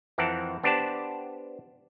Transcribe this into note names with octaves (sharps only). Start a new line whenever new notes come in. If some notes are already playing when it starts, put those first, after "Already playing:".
F2 E3 C4 A#4 F#5 A5
B3 D4 G4 C5 D5 A5